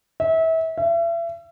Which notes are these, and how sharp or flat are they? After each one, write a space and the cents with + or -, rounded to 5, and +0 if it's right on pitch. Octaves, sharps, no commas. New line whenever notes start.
E5 -30
E5 +35